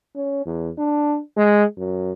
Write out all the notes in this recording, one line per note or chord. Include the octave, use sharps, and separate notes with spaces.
C#4
E2
D4
G#3
F#2